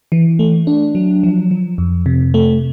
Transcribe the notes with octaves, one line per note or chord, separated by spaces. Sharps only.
E3
A3
D4
F#3
F3
F3
F2
C3
A3